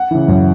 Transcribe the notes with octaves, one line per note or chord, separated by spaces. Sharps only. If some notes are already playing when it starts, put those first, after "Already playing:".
Already playing: F#5
C#3 E3
F#2